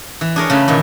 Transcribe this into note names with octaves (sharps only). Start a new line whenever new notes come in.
E3
D4 G#4 A#4 C#5
C#3 A3 B4
A#2 D#3 E3